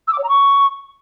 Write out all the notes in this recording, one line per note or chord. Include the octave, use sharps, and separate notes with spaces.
E6
D6
C#5
A#5
C#6